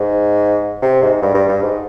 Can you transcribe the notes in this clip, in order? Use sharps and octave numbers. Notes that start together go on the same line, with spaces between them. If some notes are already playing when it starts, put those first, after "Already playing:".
Already playing: G#2
C3
G#2
G2
G2
G2
G#2